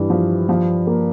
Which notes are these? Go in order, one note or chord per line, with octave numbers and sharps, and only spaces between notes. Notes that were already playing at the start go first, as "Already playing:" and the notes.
Already playing: G2 E3
F3
F3
A#3